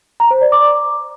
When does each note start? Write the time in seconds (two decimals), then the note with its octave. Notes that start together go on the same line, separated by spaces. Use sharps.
0.20 A#5
0.31 C5
0.41 D5
0.52 D6